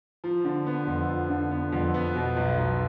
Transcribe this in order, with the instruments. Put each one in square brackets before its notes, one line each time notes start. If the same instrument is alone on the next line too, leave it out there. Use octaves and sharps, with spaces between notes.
[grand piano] F3
D3
B3
F2
F3
D3
B3
F2
B3
B2
B1
B1